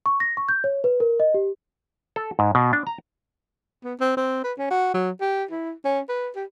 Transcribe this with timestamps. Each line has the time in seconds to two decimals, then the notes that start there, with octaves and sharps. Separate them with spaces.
0.06 C#6
0.20 A#6
0.37 C#6
0.49 G6
0.64 C#5
0.84 B4
1.00 A#4
1.20 D#5
1.34 G4
2.16 A4
2.39 G#2
2.55 B2
2.73 D4
2.87 A#5
3.84 B3
4.00 C4
4.17 C4
4.44 B4
4.58 C#4
4.71 F#4
4.94 F#3
5.21 G4
5.51 E4
5.85 C#4
6.09 B4
6.36 G4